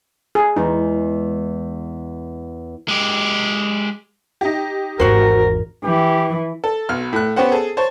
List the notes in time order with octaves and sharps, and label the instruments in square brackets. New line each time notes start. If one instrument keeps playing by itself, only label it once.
[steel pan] G#4
[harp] E2 G#3 [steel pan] D#4
[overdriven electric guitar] G#3 G4
[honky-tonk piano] D#4 G4
[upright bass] G#1 E2 [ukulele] F#4 C5 [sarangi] A#4
[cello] E3 [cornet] G4
[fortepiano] A4
B1 F6
A2 F#6
B3 C#4 G4 C5 F#5
G#4 A4
C5 C#5 A5